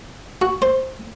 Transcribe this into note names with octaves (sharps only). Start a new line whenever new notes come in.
F#4
C5